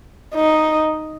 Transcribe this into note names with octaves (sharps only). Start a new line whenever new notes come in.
D#4